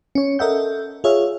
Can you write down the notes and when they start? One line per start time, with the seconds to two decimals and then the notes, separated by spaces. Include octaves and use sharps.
0.15 C#4 C#5
0.39 A4 A#4 D#5 E5 F#5 G6
1.04 F4 G#4 C#5 E5 F5